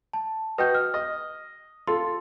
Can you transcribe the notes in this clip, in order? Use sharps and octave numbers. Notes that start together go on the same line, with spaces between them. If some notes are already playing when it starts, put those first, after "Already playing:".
A5
F#4 B4 D#5 G5 G6
F6
D#5
F4 A4 C6